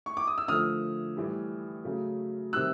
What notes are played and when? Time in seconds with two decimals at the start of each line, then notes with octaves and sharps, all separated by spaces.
0.06 C#6
0.17 D6
0.27 D#6
0.38 E6
0.48 D3 F3 A3 D#6 F6
1.16 A2 E3 G3
1.85 C#3 F#3 A3
2.53 C3 D#3 G3 E6 F#6